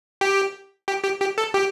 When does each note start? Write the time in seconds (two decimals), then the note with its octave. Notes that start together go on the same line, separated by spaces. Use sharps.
0.21 G4
0.88 G4
1.04 G4
1.20 G4
1.38 A4
1.54 G4